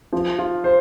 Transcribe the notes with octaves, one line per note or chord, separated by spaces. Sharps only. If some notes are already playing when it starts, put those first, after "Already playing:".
F3
F4
C5